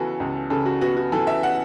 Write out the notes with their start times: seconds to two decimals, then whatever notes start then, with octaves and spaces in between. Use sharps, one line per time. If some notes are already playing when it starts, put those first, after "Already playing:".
Already playing: C#3 E3 B3 F#4 A4
0.20 C#2
0.50 C#3 A4
0.65 F#4
0.81 B3 F#4
0.97 F#4
1.12 E3 A4
1.27 E5
1.43 F#5